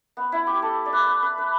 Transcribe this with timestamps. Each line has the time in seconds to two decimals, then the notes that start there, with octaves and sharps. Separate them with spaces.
0.17 B3
0.32 E4
0.47 G4
0.62 A4
0.86 D5
0.93 B4
1.07 B4
1.22 B4
1.38 B4